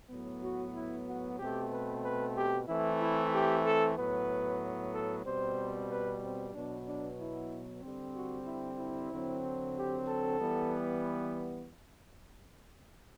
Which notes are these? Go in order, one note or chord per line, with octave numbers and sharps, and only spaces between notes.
A2 F#3 B3
F#4
E4
F#4
B2 A3 C4 G4
B4
B4
G4
E3 A3 C4 E4
E4
G4
A4
A2 F#3 B3 B4
A4
B2 G3 C4 C5
B4
C4
B2 F#3 B3 D4
D4
E4
D3 G3 C4
F#4
E4
E4
D3 F#3 C4
G4
A4
E3 G3 B3